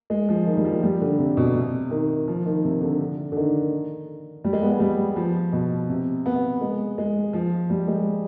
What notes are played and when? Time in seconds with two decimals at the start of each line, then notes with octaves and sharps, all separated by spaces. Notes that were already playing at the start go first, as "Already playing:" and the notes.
0.10 G#3
0.29 F3
0.47 D#3
0.57 G3
0.65 F3
0.83 G3
1.01 D3
1.19 C3
1.37 B2
1.55 C3
1.91 D#3
2.28 F3
2.46 D#3
2.64 C3
2.81 D3
3.00 D3
3.32 D3
3.37 D#3
4.44 G3
4.53 G#3
4.63 B3
4.72 G#3
4.80 G3
5.16 F3
5.53 B2
5.89 C3
6.26 B3
6.61 G#3
6.98 G#3
7.33 F3
7.70 G3
7.88 G#3